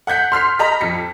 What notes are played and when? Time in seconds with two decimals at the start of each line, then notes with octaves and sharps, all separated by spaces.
0.07 F#5 F#6 G6 B6
0.32 C6 F6 B6 C7
0.59 D#5 A#5 B5 B6
0.81 F2 B6 C#7